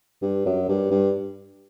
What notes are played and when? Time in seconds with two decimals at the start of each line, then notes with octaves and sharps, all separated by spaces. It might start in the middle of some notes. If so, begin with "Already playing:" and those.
0.22 G2
0.45 F#2
0.68 G2
0.91 G2